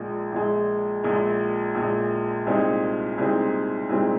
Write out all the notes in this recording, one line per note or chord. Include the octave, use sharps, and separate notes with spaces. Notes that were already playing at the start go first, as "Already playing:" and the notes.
Already playing: A#1 A#2 G#3
A#1 A#2 G#3
A#1 A#2 G#3
A#1 A#2 G#3
C2 A#2 G#3 C4 D#4
C2 A#2 G#3 C4 D#4
C2 A#2 G#3 C4 D#4